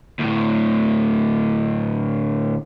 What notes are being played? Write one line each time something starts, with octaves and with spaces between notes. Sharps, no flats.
D2 A2